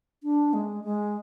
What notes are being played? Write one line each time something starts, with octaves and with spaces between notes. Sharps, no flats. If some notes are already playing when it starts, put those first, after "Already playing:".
D4
G#3
G#3